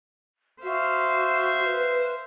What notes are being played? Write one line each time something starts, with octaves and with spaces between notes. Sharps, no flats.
F#4 C5 E5 F5
B4